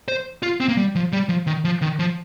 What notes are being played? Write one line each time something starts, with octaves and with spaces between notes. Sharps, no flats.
C5
F4
C4
A#3
G3
F3
G3
F3
D#3
F3
D#3
F3